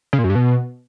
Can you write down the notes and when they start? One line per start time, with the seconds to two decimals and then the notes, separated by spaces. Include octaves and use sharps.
0.13 C#3
0.18 A#2
0.24 F#2
0.30 G2
0.35 B2